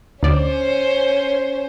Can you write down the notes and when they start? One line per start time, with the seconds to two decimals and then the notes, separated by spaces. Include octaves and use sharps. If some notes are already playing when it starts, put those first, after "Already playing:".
0.23 D2 C#4 C5 D5